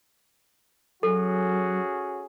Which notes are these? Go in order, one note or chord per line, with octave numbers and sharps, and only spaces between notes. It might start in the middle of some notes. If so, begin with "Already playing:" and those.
F#3 C#4 F#4 G#4 A4